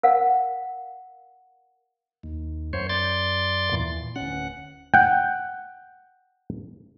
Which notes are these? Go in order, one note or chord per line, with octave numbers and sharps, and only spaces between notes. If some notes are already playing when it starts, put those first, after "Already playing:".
A#4 F5 F#5
D#2
F#2 C5 C#5
D5 C6 A6
D#2 A#2 E3
D1 C#4 F#5
F#5 G5